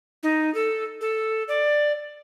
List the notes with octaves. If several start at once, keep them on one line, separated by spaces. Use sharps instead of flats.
D#4
A4
A4
D5